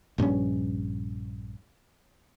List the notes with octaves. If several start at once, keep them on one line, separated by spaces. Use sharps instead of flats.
A#1 G2 F3 C#4